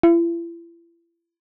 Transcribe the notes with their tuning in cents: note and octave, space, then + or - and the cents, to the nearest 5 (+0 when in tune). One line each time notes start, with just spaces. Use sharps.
E4 +40